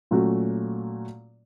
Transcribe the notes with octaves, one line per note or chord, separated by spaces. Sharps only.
A#2 F#3 A3 C#4 F#4